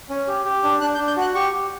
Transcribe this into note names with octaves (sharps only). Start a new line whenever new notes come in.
C#4
G4
G4
D4
D4 F#6
G6
D4
G6
F#4 F#6
G4 C#6
G4